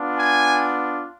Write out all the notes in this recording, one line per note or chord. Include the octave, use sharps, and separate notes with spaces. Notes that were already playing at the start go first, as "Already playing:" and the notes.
Already playing: B3 D4 F4
G#5